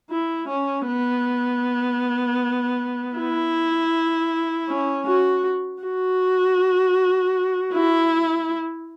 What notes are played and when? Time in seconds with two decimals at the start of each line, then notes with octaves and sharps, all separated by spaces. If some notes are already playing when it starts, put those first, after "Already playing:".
0.10 E4
0.48 C#4
0.88 B3
3.17 E4
4.69 C#4
5.07 F#4
5.83 F#4
7.73 E4